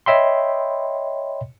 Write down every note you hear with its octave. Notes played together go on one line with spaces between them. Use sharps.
C#5 D#5 E5 G5 B5 C6